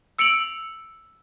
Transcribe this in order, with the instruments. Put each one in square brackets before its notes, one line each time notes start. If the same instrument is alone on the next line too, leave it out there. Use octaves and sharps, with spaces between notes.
[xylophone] E6 C#7 D7 F7 F#7